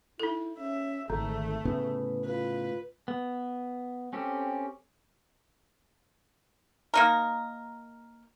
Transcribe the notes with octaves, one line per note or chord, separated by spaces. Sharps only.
D#4 E4 A4
C#4 E5
G#1 D3 D#3 A3
A2 C#3 B3 B4
F4 B4
B3
C4 C#4 G4 A4
A#3 D#4 A#4